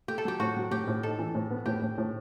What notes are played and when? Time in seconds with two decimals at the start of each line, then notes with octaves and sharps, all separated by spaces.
0.08 A3 G4
0.18 A4
0.25 F#3 G4
0.40 A2 F#4
0.56 F#3
0.71 A2 G4
0.87 A2
1.03 D#4 A4
1.19 E3
1.35 A2
1.50 B3
1.66 A2 G4
1.82 A2
1.98 A2